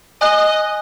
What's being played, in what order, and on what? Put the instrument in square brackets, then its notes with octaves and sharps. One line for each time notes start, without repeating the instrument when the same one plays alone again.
[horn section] D#5 [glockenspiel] G#5 F#6